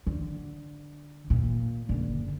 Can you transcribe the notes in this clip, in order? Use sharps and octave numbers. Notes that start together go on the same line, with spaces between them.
D3
A#2
F#1 D3